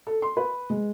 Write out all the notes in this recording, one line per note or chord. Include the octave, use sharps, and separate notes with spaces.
A4
C6
B4
G#3